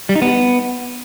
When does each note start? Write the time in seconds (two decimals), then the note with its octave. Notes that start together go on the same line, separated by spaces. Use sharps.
0.09 G3
0.15 D#4
0.22 B3